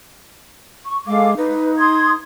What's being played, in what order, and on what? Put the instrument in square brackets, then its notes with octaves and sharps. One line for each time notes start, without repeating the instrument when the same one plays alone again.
[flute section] C#6
[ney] G#3 [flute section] A4 F5 D6
[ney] D#4 [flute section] B4
[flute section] C6 D#6 G#6